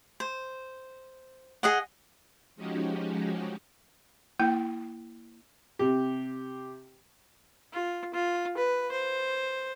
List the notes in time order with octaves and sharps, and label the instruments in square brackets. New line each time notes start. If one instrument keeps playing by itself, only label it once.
[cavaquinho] C5
G#4 D#5 F#5
[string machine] F3 G#3 C#4 D#4 F#4 G4
[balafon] A#3 E4 G5
[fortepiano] C3 G4
[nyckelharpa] F4
F4
B4
C5